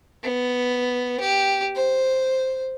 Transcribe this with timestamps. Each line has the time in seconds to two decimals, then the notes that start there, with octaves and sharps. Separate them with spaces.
0.23 B3
1.20 G4
1.76 C5